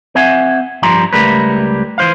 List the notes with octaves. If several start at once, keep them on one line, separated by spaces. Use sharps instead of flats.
C4 E5 F#5 G#5
G2 F3 G3 A#5 C6
C#2 G3 A3 A#4 B4
E3 C5 F5